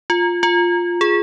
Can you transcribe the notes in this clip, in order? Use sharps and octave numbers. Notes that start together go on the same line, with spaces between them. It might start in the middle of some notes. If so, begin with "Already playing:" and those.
F4
F4
G#4